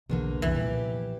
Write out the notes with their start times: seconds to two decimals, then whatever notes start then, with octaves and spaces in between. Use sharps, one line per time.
0.09 B1 E2 D3 A#3
0.42 C2 F#2 E3
0.55 A#2 F3 G4